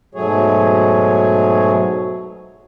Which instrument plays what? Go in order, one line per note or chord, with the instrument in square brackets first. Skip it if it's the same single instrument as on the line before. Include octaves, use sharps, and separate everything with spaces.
[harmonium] G#2 B2 F#3 A3 G#4 C#5